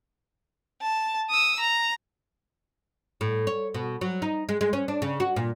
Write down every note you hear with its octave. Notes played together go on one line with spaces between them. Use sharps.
A5
D#6 E6
A#5
A2
C#5
B2
F#3
D#4
G#3
G#3
C#4
D4
C#3
F#4
A#2